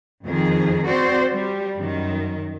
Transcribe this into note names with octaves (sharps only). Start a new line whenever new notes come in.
F2 D#3 G#4
C4 F#4 C5 D5
G3
F#2 D#3